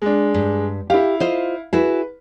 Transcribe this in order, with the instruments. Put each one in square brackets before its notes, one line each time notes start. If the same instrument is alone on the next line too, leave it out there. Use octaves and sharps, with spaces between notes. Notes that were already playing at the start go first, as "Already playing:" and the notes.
[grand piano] G#3 D4
[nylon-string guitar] G2
[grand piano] E4 F5 [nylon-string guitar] G4
[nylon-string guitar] F4 C5 D#5
[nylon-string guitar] E4 F#4 G#4 [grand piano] B4